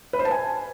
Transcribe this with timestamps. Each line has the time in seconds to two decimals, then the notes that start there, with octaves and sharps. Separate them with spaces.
0.13 B4
0.19 C5
0.25 A5
0.31 G#5